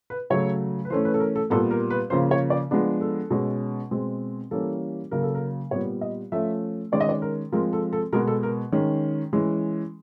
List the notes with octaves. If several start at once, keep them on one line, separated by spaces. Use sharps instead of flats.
B4
C#3 F#3 A3 C#5
B4
E3 A3 C#4 C5
B4
A4
A#4
A4
A#2 G3 B3 A4
A#4
B4
C#3 F3 A#3 C#4 C5
C#5
D5
F3 G#3 B3 D4
A4
B2 G#3 C#4
B2 G#3 C4
E3 G3 A#3 C#4 A4
C#3 F#3 A#3 A#4
A4
A#4
A#2 G3 B3 C#5
D#5
F3 A3 C#4 E5
D#3 G#3 C#4 D5
D#5
D5
A#4
F3 G#3 C4 A#4
A4
A4
B2 G#3 B3 A#4
A4
A#4
D#3 G#3 C#4
E3 G#3 C#4